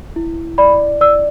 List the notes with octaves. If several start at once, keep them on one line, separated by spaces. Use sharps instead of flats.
E4
D5 B5
D5 E6